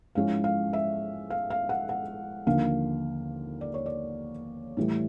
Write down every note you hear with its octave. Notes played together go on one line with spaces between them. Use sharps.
G#2 F3 G#3 C#4 E4 F5
F5
E5
F5
F5
F#5
F#5
D#2 D3 F3 A#3 D4 F5
D5
C#5
D5
A2 E3 G3